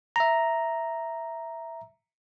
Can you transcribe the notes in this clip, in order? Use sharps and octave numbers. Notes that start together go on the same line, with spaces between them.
E5 A#5